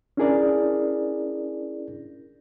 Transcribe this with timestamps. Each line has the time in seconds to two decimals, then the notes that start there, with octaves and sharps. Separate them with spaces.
0.17 C#4 D4 E4 G#4 A#4 D5